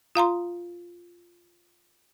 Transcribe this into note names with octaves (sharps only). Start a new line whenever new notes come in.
F4 F5 A#5 C6